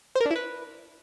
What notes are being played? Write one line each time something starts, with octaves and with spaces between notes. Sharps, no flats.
C5
A#4
D4
E4
B4